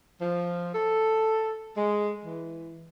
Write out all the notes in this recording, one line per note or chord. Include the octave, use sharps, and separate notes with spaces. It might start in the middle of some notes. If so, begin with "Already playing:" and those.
F3
A4
G#3
E3